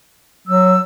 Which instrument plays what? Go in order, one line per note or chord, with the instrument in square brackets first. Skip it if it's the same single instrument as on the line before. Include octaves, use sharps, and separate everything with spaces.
[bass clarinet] F#3 [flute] E6